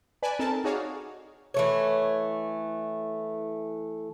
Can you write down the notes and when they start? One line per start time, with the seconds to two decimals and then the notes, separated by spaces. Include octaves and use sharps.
0.22 B4 D5 G#5 A5 B5
0.39 C4 D#4 A4 A#4 A5
0.64 D#4 F#4 G#4 C#5 D5 F5
1.54 E3 A3 C#5